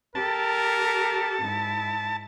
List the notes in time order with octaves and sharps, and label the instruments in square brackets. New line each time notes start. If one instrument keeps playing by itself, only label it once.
[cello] G4 A4 [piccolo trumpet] A#4 [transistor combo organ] A5
[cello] G#2 E4